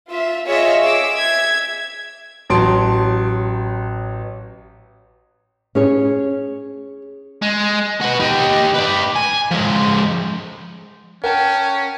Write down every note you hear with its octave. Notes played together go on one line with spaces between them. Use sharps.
F4 E5
F4 G#4 C#5 D#5 E5
G#4 D6 E6
E5 G#6
A1 F#3 A5 C6 D7
C#4 G#4 C#5
G#3
F#4 B4
D#4 G4
B4 D5
G#5
F3 G#3
C#4 A#4 F#5 G5 A5